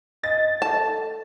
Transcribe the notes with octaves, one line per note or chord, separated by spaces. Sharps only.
D#5 A6
A4 A5